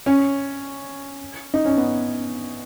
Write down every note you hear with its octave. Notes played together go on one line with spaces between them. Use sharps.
C#4
D#4
C#4
B3